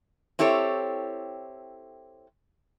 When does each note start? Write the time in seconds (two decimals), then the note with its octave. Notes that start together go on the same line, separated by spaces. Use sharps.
0.39 C4 E4 G4 A4 C#5